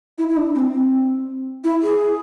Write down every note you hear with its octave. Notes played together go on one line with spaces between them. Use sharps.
E4
E4
D4
C4
C4
E4
G#4